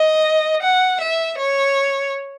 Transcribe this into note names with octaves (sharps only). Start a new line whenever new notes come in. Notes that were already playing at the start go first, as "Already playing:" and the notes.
Already playing: D#5
F#5
E5
C#5